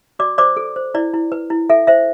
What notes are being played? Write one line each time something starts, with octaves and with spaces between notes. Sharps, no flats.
F#4 D5 D6
C5 D5 D6
A4
C5
E4 D5
E4
B4
E4
A4 E5
C5 E5